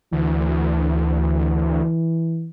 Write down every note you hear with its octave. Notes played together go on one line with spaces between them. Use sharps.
D2 E3